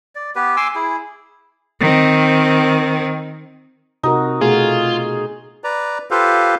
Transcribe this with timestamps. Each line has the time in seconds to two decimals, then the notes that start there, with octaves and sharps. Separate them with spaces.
0.15 D5
0.36 B3 G4 B4
0.57 G#5 C6 D6 E6
0.75 E4 G#4
1.80 D#3 C4
4.03 C3 D#4 F#4 A#4
4.41 B2 A3 F4 F#4 G#4
5.64 B4 D5 A#5
6.11 F4 G4 A4 B4 C5 F5